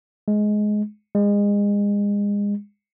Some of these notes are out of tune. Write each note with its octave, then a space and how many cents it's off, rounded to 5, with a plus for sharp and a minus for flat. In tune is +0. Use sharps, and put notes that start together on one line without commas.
G#3 +15
G#3 -30